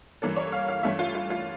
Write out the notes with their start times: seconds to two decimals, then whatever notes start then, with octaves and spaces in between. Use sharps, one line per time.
0.22 G2 E3 A#3 C#4 A4
0.36 C#5
0.52 F5
0.68 F5
0.83 G2 E3 A3 C#4 E5
0.99 F4
1.15 F4
1.30 F4